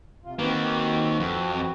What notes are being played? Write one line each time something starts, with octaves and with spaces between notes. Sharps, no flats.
C3 F4
D#3 A#3 C4 F#4 B4
F2